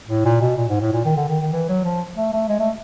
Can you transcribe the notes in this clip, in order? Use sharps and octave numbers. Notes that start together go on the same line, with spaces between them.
A2
A#2
B2
A#2
G#2
A2
A#2
D#3
D3
D#3
D#3
E3
F#3
F3
A3
A3
G#3
A3